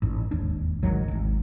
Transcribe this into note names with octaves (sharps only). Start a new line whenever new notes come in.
A1 G#2
E1 D#2 D4
A1 G#2 D#3 F#3
D1 G#1